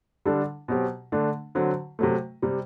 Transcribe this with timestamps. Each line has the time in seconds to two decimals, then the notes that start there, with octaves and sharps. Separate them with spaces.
0.25 D3 G3 D4 A4
0.68 B2 F#3 C4 G4
1.12 D3 A3 D4
1.55 D3 F#3 C4
1.99 C3 F#3 A3
2.42 C3 G3